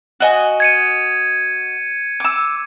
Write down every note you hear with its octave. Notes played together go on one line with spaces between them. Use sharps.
F#4 D#5 G#5
G#6 C#7 D#7
D6 E6